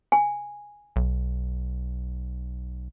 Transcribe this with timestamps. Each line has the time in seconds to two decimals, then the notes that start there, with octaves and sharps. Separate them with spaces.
0.12 G#5
0.96 B1